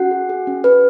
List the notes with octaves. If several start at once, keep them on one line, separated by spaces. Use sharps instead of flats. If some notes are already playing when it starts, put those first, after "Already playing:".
Already playing: C#4 F#4 F#5
G#4
G#4
C#4
C#4 B4